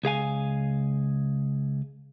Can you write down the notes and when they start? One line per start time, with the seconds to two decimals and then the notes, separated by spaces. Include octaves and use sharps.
0.03 C#2 G#4 F5 G#5